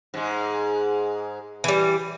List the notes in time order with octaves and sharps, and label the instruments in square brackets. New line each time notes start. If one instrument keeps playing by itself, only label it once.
[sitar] G#2 G#3
[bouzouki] E3 G3